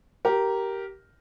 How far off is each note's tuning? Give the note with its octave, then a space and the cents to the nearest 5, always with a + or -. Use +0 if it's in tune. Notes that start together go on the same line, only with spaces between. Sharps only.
G4 -15 A#4 +0